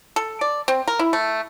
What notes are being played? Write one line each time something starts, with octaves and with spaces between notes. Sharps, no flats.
A4
D5
C4
A#4
E4
A3